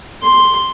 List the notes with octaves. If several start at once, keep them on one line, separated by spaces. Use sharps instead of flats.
C6